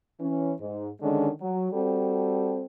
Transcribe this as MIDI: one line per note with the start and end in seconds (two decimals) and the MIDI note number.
0.20 0.53 52
0.20 0.53 61
0.60 0.88 44
1.02 1.29 50
1.02 1.29 51
1.02 1.29 56
1.02 1.29 61
1.02 1.29 62
1.41 1.72 54
1.72 2.65 55
1.72 2.65 60
1.72 2.65 66
1.72 2.65 69